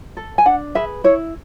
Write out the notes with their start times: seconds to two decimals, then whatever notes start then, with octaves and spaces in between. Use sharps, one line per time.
0.17 A4
0.38 G#5
0.46 D4 F#5
0.75 G#4 B4 E5
1.04 E4 C#5